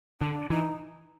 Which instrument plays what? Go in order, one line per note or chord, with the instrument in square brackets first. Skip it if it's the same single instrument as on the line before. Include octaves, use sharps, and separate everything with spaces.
[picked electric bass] D3 [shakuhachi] D4
[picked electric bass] E3 [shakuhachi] D#4